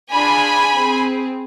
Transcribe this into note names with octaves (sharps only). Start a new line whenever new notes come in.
D4 F4 G#4 G#5 B5
C4 G#4